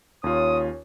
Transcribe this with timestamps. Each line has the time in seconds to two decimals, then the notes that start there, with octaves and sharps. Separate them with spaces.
0.24 D#2 C#4 F4 C#5 D#6